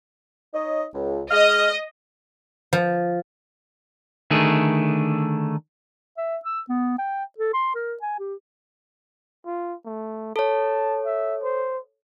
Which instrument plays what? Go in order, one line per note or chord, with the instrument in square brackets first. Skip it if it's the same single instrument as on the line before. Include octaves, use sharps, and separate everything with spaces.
[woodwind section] D#4 C#5 D#5
C#2
[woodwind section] G#3 F6 [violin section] D#5
[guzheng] F3
[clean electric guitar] D3 D#3 A3 D4 G#4
[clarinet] E5
E6
B3
G5
A4
C6
A#4
G#5
G4
[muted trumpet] F4
A3
[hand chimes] A4 C#5 [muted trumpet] A5
[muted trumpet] E5
C5